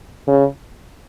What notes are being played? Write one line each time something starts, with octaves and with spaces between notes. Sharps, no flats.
C#3